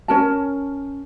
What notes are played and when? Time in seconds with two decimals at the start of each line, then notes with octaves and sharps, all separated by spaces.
0.08 C#4 A#4 A5